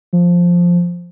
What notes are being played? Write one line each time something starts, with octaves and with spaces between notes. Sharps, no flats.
F3